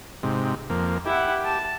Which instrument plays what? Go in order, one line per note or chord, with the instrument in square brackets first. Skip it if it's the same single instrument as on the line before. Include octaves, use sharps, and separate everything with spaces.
[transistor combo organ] G#2 C3
F2 A#3
[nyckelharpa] E4 F#5 [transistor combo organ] G4
[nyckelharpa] A5